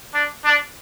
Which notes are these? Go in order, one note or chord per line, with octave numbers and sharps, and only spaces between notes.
D4
D4